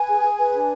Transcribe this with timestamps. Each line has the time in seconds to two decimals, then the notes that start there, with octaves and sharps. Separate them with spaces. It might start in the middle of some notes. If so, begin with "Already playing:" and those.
Already playing: B4 G#5
0.08 G#4
0.23 G#4
0.39 B4
0.53 D4